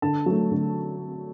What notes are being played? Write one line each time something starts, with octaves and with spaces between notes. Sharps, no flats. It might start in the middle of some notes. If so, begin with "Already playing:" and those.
D3 A5
F#3 A3
D3